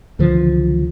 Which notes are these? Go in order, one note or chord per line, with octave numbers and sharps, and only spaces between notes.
C#2 D3 E3 F3